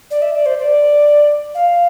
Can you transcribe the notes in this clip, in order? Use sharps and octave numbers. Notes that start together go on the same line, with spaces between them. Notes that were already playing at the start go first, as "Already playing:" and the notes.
D5
E5
D5
C5
D5
F5